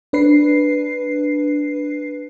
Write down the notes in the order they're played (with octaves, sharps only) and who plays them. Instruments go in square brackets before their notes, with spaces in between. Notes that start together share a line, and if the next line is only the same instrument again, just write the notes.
[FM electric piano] D4 B4 C7